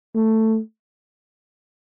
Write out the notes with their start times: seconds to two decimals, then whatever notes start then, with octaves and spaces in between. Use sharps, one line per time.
0.15 A3